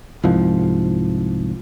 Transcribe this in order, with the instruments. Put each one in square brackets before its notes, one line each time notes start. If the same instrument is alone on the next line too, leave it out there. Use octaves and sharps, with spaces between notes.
[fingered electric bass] C2 G#2 F3